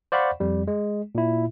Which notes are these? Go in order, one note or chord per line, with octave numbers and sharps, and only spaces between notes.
C5 D5 F5 F#5 B5 C#6
F2 G3
G#3
A#2 E4